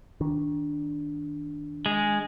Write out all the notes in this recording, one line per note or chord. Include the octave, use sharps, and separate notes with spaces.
D#3 D4
G#3